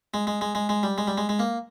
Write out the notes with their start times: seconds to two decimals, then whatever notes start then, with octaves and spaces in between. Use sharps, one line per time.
0.14 G#3
0.27 G#3
0.41 G#3
0.55 G#3
0.69 G#3
0.83 G3
0.98 G#3
1.07 G3
1.18 G#3
1.29 G#3
1.39 A#3